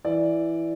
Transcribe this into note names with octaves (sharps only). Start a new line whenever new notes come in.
E3 D5